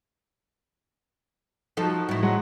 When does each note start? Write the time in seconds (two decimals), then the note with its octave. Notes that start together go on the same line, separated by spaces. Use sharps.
1.77 F3 D#4 F#4 A4
2.09 A2 E4
2.23 F#3 G#3 F#5